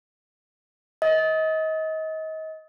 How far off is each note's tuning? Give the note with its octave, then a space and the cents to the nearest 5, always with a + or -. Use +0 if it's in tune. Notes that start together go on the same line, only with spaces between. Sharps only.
D#5 +30